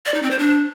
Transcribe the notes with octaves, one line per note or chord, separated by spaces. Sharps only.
D5
D#4
C4
C5
D4